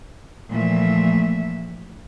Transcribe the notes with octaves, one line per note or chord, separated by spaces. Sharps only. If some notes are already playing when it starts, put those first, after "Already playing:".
A#2 E3 F3 A3 E5